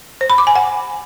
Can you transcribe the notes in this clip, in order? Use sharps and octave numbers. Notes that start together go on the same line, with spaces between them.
C5
B5
D6
G#5
F#5